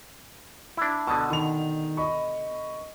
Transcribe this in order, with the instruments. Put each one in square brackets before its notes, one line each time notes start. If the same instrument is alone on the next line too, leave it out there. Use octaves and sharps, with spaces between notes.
[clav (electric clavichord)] D4 E4
[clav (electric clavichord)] B2 D3 [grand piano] A5 D#6
[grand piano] D#3 F7
D#5 B5 C#6